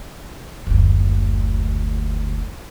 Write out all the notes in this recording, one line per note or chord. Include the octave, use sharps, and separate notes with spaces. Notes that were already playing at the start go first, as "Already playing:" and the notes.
F#1 D2